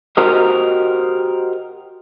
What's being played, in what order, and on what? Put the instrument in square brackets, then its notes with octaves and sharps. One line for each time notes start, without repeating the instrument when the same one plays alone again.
[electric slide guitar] F#4 G4 A#4 C5 D#5